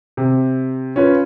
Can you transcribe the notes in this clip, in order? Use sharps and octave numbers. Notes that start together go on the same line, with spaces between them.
C3
C#4 F4 B4